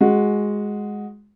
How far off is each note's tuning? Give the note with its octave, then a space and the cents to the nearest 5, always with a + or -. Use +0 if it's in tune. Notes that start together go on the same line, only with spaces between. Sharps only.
G#3 +0 F#4 -5